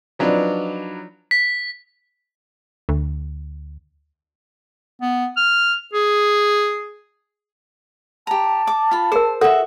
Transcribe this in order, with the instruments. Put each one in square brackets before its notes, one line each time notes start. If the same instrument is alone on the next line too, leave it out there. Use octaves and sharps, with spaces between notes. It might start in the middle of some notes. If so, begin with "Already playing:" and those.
[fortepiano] F3 F#3 D4 D#4 B4 D5
[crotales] B6
[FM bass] D2
[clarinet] B3
F6
G#4
[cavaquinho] G4 A#5 [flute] A5
[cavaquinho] D6
F4 B5
[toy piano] G#4 A#4 [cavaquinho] C5
[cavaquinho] F#4 E5 [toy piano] A4